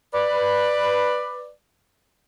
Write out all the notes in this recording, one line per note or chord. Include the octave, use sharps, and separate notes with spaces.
B4 D5